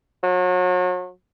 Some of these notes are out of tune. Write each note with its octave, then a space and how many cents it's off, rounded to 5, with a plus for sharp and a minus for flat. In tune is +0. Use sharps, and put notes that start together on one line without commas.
F#3 -35